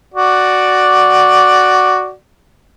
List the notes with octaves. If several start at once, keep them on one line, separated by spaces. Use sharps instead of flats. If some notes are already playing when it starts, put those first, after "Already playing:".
F#4 D5